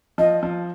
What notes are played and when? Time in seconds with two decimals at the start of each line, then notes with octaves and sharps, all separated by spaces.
0.18 F3 D#5
0.43 F3